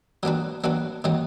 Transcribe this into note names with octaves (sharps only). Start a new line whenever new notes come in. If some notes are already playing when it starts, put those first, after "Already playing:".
F#3 A#3 D4 F#4 B4
F#3 A#3 D4 F#4 B4
D#3 F#3 A#3 C#4